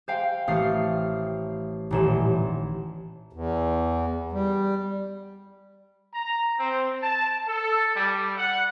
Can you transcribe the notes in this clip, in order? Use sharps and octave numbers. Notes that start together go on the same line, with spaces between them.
C5 F5 G5
A1 A3 D#6 F6 C7
D#1 A1 E7
E2
G3
A#5
C4
A5
A4
G3
F#5